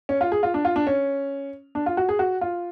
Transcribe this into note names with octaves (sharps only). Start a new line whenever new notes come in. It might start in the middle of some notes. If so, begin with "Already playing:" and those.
C#4
F4
G#4
F4
D4
F4
D4
C#4
D4
F4
F#4
G#4
F#4
F4